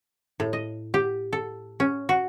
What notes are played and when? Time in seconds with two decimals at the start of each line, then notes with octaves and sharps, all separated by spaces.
0.40 A2
0.53 D#5
0.94 G4
1.33 A4
1.80 C#4
2.09 F#4